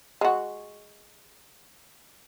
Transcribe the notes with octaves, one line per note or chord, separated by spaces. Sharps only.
G#3 F#4